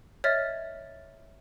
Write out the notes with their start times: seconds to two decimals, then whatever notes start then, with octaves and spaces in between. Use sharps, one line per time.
0.24 C#5 D#5 E5 F6 A6